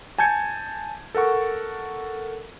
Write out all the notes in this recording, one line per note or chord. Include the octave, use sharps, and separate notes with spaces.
G#5 A5 G6 G#6 C#7
A4 A#4 F#5 C#6